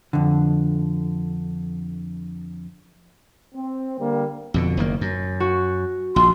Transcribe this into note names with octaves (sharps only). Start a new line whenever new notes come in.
F2 D3
C4
D3 G3 A#3
F2 B2 D3
F#1 D#3 A#3
F#2
F#4
A#1 C6